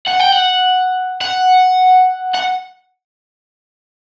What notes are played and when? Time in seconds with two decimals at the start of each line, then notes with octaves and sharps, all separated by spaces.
0.07 F#5
0.19 G5
0.32 F#5
1.21 F#5
2.35 F#5